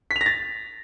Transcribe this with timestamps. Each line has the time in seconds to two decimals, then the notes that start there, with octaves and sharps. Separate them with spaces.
0.11 B6
0.16 F7
0.21 A#6
0.26 A6